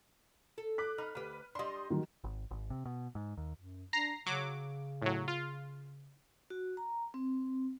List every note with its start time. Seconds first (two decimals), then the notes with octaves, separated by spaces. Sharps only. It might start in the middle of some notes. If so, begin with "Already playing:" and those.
0.58 A4
0.78 D6 F#6 B6
0.98 D#4 B5 F6
1.15 D2 G4 B4
1.55 G3 D4 D#5 C6
1.90 D#3 F#3 G3
2.24 G#1
2.51 G#1
2.70 C3
2.86 B2
3.15 G#2
3.37 D#2
3.59 F#2
3.93 D4 A#5 A#6 C7
4.26 C#3 F#3 D6
5.02 A2 F#3
5.28 F4
6.50 F#4
6.77 A#5
7.14 C4